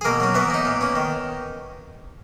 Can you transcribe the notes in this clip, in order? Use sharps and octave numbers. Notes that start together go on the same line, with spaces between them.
G#4
B2 A#3 A#4
F#3 C#4
E3 B3 B4
A#3 D#4
A#2
A#3 C#4
D#3